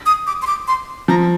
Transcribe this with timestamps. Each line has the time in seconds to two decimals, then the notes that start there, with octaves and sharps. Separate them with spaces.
0.06 D#6
0.27 D6
0.42 C6
0.47 D6
0.68 C6
1.08 F3 A#5